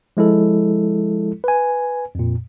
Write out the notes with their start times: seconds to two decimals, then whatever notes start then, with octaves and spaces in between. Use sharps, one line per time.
0.17 F3 G#3 E4 A4
1.44 B4 G#5
2.15 F2 A#2